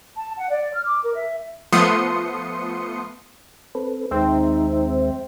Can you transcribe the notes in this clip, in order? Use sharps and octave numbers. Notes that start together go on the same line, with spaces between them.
A5
F#5
D5
F6
D6
A#4
E5
F3 A3 B3 C6 D#6 C#7
C4 A4 B4
D#2 G#3 C4 D#4 E5